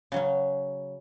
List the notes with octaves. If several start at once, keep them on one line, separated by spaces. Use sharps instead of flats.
C#3 F#3 C#4